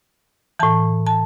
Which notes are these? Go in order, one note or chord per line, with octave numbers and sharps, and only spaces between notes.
A2 E3 A5
A5